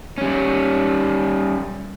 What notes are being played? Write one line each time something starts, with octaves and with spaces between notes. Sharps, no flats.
G3 C#4